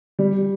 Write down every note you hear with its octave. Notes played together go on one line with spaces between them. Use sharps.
G3